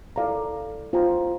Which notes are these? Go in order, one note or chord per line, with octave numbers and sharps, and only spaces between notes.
E4 A4 D5 F5 A#5
F4 C5 G5 A#5